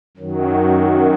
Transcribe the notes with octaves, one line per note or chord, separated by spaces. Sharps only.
F#2 D#3 F#3